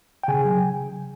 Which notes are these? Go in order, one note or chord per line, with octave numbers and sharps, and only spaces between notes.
G5
C#3 G#4 G#5
F#3
C#3